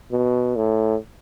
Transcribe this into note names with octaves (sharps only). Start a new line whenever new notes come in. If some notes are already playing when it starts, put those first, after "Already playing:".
B2
A2